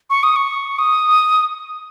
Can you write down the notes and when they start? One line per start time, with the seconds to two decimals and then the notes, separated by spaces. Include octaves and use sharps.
0.10 C#6
0.23 D#6
0.36 C#6
0.79 D#6